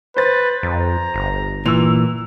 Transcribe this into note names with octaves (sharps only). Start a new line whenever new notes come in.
B4 C5 A6
F2 A#5
G1
A#2 E3 E6 F7